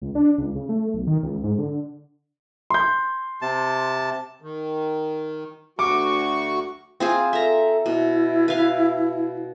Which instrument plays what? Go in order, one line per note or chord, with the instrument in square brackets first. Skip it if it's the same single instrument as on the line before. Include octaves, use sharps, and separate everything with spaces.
[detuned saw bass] C#2
D4
C#2
C#3
A3
B1
D#3
C#2
G#2
D3
[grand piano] C6 G6
[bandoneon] C3 A5
[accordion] D#3
[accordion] D2 F#4 C#6 [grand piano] D6
[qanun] C4 F4 G#4
[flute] A4 [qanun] E5 A#5
[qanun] B2 [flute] E4
[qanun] B4 F5